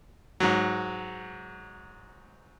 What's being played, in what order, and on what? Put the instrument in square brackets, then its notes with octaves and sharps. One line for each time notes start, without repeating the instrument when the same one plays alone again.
[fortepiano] G#2 F#3